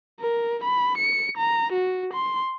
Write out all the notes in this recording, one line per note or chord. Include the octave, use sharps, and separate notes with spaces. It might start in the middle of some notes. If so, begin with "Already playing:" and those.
A#4
B5
C#7
A#5
F#4
C6